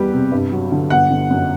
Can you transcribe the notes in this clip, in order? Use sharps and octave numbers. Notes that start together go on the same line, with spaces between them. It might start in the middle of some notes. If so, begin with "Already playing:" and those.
Already playing: E2 G3 G4 B4
C3
G2
F#3
D3
G1 F#5
D3
F#2